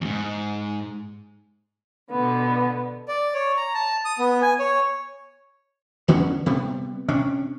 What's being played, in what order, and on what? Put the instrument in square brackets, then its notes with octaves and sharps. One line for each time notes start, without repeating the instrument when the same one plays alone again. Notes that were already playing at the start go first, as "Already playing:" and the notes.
[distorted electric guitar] E2 G#2
[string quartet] B2 D3 B3
[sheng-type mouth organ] D5
C#5
A#5
A5
D#6
B3
G#5
C#5
[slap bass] E2 D3 B3 C#4
C3 G3 B3
C3 C#4 D4